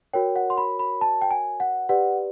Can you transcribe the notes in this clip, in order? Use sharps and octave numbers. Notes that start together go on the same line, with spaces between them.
F#4 A#4 C#5 G5
F#5
C6
B5
B5
A5
G5
G#5
F#5
G4 B4 D5 F#5